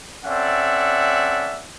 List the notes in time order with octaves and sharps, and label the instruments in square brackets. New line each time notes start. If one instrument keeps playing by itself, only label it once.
[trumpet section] C4 C#4 A4 D5 E5 F#5